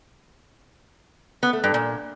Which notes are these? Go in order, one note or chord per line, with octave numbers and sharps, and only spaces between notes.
B3
A3
G2
A#2